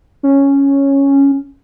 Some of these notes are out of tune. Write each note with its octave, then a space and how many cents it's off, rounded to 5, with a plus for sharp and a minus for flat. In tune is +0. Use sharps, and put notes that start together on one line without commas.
C#4 +0